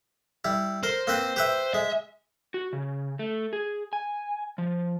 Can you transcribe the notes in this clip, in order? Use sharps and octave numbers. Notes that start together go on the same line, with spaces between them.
G3 E4
A#4 C5
A#3 C4 B4
G4 B4 E5
G#3 E5
F#4
C#3
A3
G#4
G#5
F3